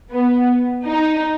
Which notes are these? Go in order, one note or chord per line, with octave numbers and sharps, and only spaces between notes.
B3
D#4